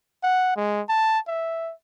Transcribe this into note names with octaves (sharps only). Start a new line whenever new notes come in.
F#5
G#3
A5
E5